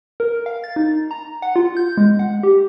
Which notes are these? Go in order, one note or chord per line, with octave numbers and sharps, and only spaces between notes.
A#4
F5
A6
D#4
A#5
F#5
F4
G6
G#3
F#5
G4